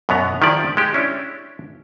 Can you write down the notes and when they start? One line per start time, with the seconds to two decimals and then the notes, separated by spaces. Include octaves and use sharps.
0.09 F#2 B2 B3 A#5
0.42 D#3 F3 E4 G4 D5
0.77 G#3 G4
0.94 C#4 D4 E4